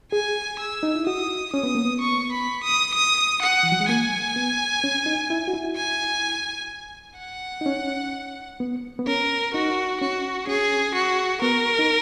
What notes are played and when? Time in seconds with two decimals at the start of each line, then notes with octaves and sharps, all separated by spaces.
0.12 G#4 G#5
0.59 E6
0.83 D#4
0.95 E4
1.07 F#4 D#6
1.53 C#4 D#6
1.63 B3
1.75 A#3
1.85 B3
2.01 C#6
2.32 B5
2.64 D#6
2.94 D#6
3.43 F#5
3.63 E3
3.72 F#3
3.80 G#3
3.89 A#3 G#5
4.36 B3
4.84 C#4
5.06 D#4
5.30 E4
5.48 F#4
5.53 E4
5.77 G#5
7.19 F#5
7.61 D#4
7.66 C#4
8.60 B3
8.99 B3
9.07 C#4 A#4
9.54 D#4 F#4
10.01 C#4 F#4
10.47 C#4 G#4
10.95 F#4
11.42 B3 A#4
11.79 D#4